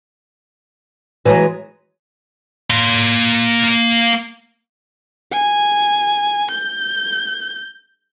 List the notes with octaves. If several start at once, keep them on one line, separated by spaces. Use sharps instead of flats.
E3 F#3 G#3 B4 A#5
A#3 C6
G#5
G6